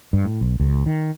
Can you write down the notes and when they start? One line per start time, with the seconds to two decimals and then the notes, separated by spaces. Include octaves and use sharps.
0.13 G2
0.25 A2
0.41 B1
0.60 C#2
0.86 D#3